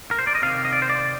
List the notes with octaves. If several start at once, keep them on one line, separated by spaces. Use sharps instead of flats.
A#4
C5
D5
D#5
C3 D#3 A#3 F5
D#5
D5
C5
D5